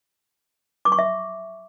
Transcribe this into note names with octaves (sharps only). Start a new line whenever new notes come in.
D6
C#6
E5